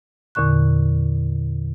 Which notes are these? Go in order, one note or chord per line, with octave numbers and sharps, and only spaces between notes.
E2 A#2 D3 C#6 F#6